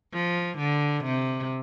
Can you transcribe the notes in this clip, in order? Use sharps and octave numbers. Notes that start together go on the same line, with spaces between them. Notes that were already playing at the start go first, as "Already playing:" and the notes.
F3
D3
C3